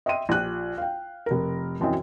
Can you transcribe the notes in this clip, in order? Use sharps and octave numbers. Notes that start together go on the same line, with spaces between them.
D#5 E5 G5 C6 D#7
A#1 F3 G4 F#6
F5 G5
F1 A#4
E1 F#2 E3 C4 D#5